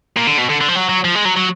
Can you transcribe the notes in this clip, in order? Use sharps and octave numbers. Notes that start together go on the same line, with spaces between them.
A#2
D3
B2
D3
D3
F3
F#3
F#3
F3
G#3
F#3
F#3